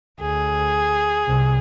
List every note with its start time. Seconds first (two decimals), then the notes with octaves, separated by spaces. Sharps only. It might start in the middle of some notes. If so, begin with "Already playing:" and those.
0.21 D2 G#4
1.26 C2 C3